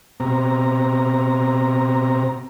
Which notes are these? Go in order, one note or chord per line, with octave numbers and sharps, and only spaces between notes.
B2 C4 A#5